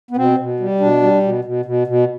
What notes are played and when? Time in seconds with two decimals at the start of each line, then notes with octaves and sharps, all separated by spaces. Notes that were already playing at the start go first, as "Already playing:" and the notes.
0.11 B3
0.17 B2 C4
0.39 B2
0.60 G3
0.80 B2 D4
1.02 G3
1.23 B2
1.45 B2
1.65 B2
1.87 B2